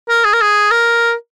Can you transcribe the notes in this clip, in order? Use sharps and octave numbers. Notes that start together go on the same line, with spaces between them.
A#4
G#4
A#4
G#4
A#4